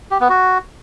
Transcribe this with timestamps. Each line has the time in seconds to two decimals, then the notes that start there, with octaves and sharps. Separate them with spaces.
0.11 G4
0.20 B3
0.29 F#4